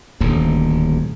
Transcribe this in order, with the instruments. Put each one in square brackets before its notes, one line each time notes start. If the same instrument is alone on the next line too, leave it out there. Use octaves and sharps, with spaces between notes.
[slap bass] D#1 D2 A2